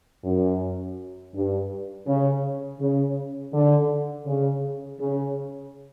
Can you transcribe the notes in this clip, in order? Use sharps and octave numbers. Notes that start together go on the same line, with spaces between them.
F#2
G2
C#3
C#3
D3
C#3
C#3